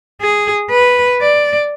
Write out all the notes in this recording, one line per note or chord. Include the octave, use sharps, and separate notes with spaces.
G#4
B4
D5